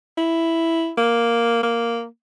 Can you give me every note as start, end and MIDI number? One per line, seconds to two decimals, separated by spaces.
0.18 0.92 64
0.98 1.59 58
1.63 2.05 58